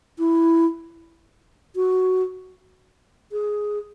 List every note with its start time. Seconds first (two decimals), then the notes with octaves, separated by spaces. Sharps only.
0.19 E4
1.76 F#4
3.32 G#4